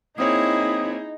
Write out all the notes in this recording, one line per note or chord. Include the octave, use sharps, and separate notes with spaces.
A#3 C4 D#4 E4 G#4 C#5 D#6